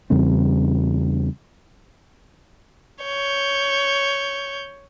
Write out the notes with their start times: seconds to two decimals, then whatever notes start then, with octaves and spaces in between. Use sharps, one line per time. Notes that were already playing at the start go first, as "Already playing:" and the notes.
0.10 E2 C#3 G3 C4
3.04 C#5 G6